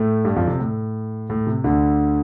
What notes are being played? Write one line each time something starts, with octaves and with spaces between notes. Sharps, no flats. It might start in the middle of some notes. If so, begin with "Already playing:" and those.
Already playing: A2 A3
G2 G3
F2 F3
C3
A2
A2
C3
D2 D3